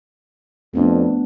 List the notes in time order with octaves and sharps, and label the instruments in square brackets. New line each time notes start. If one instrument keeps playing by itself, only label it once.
[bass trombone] F2 [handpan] A3 B3 D4